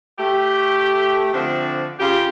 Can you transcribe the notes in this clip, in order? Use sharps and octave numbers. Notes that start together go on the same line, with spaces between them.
A3 G4
D3 F3 A3 C4 D4
C#3 F4 G4